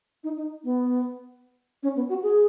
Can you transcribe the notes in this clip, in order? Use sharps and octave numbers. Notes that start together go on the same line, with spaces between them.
D#4
D#4
B3
C#4
B3
F#4
G#4